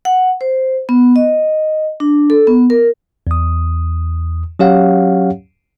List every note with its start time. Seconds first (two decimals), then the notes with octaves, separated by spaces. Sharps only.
0.05 F#5
0.41 C5
0.89 B3
1.16 D#5
2.00 D4
2.30 A4
2.47 B3
2.70 A#4
3.27 E2 D#6
4.59 F#3 C#4 G4 C#5 F5 F#5